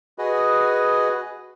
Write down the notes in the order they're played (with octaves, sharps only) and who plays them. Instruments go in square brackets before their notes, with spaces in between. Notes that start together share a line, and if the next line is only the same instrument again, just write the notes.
[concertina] F#4 G#4 B4 D#5